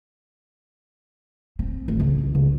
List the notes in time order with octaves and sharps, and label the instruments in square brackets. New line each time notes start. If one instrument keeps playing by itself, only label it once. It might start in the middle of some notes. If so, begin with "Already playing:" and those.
[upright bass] C4
A1
C#2
C#2